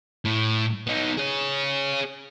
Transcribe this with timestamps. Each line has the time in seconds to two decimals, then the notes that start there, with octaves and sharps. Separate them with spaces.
0.25 A2
0.87 B3 D#4
1.17 G#4 C#5